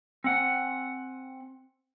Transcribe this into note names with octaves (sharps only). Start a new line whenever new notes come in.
C4 F#5 G#5